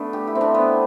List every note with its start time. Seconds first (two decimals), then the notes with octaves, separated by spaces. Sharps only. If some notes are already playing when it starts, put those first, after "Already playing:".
Already playing: A3 B3 D4
0.13 G4
0.27 E4
0.35 C4
0.41 D4
0.55 B3